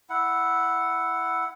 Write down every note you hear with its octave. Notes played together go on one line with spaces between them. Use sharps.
E4 F#5